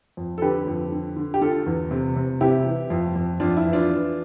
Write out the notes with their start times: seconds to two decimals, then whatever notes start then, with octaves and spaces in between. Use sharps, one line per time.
0.17 F2
0.38 A4
0.42 D3 G4 B4
0.67 F2
0.92 D3
1.17 D3
1.34 G4
1.41 D3 F4 A4
1.66 E2
1.91 C3
2.16 C3
2.41 C3 E4 G4
2.66 E3
2.90 F2
3.16 F2
3.40 F2 D4 F4
3.57 E4
3.65 E3
3.73 D4 F4
3.89 E3